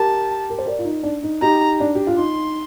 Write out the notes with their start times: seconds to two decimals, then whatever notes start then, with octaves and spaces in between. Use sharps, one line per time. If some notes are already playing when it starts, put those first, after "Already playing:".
Already playing: G4 A#4 A5
0.50 A#4
0.58 C5
0.66 A#4 D5
0.79 F4
0.85 D#4
1.03 D4
1.23 D#4
1.41 D#4 G4 A#5
1.80 D4
1.95 G4
2.07 F4
2.17 D#4 C6